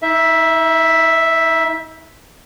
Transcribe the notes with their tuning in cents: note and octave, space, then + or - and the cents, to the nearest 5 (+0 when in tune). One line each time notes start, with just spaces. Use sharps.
D#4 +40 E5 +0